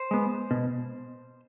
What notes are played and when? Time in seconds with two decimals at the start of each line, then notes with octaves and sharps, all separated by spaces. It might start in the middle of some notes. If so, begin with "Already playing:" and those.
Already playing: C5
0.11 G#3 B3
0.51 B2